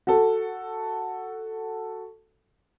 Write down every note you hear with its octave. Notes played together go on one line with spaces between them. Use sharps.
F#4 A4